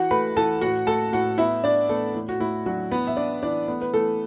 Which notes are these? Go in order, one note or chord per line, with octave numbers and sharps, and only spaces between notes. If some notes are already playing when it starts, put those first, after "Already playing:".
Already playing: E3 F#4 F#5
A3 B4 B5
E3 A4 A5
A2 F#4 F#5
A3 A4 A5
A2 F#4 F#5
B3 E4 E5
D4 D5
A3 B3 A4
A2
F#4
A2 E4
F#3 D4 F#4
E3 B3 B4
E5
D4 D5
E3 D4 D5
A3 B3 B4
B4
E3 A3 A4